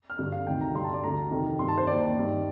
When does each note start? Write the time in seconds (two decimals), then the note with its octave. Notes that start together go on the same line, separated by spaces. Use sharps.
0.10 F6
0.19 G2 D3
0.32 F5
0.47 D2 C3 D#3 G5
0.61 A#5
0.74 G2 D3 C6
0.84 A5
0.94 D5
1.03 D2 D3 A#5
1.31 F2 C3 D#3
1.59 G2 D#3 C6
1.68 A5
1.78 C5
1.87 D#2 D#3 D5
2.15 G2 D#3